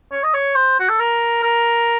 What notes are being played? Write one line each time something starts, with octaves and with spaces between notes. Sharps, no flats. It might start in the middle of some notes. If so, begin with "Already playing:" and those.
C#5
D#5
C#5
C5
F#4
A4
A#4
A#4